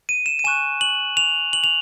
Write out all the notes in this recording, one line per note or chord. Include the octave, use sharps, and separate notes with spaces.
D#7
E7
D#7
G#5 C#6 F#6 E7
F#7
F7
F#7
F7